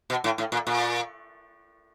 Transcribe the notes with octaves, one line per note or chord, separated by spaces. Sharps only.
B2
A2
A2
A#2
A#2